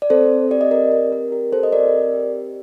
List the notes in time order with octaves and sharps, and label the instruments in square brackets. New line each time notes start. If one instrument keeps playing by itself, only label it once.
[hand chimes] D5
C4 A4 C5
G4 D5
D#5
A#4 D5
C4 A#4
A#4
G4 A#4
A4 C5
D#5
C4 A#4 D5
G4